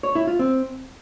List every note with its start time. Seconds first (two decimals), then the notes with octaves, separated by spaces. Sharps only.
0.03 C#5
0.15 E4
0.27 F4
0.39 C4